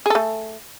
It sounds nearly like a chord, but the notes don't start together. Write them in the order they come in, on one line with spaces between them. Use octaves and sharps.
G#4 A4 A3